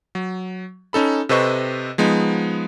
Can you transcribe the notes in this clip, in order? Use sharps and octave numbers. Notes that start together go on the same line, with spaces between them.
F#3
C#4 D#4 A4 B5
C3 A4 B4 C5 D#5 C#6
F3 G#3 B3 D#4